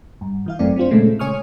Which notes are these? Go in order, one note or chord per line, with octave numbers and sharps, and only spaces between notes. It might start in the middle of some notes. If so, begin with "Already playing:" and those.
G2
E3 E4 F5
G1 F#2 A3 C4 D5
C4 D4 F4 C5
A#2 C#3 G#3 A3 C#4
C#3 C#5 G#5 C#6 D#6 F6